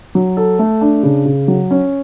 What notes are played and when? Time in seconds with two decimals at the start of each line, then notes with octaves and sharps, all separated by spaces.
0.15 F#3
0.37 A4
0.59 A3
0.81 D4
1.03 C#3
1.25 C#3
1.48 F#3
1.71 C#4